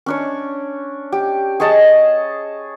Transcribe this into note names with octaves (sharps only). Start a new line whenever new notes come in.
C#4 D4 C#5
G4
G#4 C#5 D#5 A5